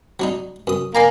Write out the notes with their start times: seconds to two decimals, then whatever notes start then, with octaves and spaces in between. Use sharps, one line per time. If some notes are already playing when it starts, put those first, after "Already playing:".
0.20 F#3 D4 D#4
0.67 F#2 D#6
0.95 A#3 D5 G#5 A#5